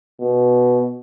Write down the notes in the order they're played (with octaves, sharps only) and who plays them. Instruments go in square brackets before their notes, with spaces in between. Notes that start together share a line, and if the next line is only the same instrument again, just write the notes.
[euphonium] B2